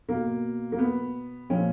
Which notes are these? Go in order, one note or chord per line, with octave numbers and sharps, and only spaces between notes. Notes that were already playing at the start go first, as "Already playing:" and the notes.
B2 A#3
A#3
B3
A#2 F3 C#4